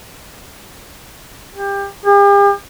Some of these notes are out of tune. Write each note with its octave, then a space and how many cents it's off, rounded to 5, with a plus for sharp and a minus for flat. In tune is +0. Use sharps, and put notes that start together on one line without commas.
G4 +25
G4 +45